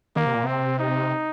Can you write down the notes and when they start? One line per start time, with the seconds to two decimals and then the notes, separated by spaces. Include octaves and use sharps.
0.16 D#3 A#3
0.26 C3
0.35 A#2
0.43 C3 C4
0.79 D#4